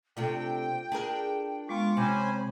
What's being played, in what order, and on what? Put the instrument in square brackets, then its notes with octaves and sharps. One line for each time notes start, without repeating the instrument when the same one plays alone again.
[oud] C3 A3 D4 [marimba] F4 A4 [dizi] G5
[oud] D4 G#4 A#4
[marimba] G#3 B3 [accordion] F4 C#6 D6
[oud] C3 [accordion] C#4 C5 G#5 [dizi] B5 [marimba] D6